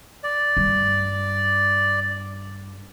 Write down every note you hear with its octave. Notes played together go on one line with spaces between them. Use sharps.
D5
G2